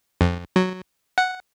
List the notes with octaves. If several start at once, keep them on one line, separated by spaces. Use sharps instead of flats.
F2
F#3
F#5